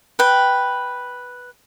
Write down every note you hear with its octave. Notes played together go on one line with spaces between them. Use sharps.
B4 G5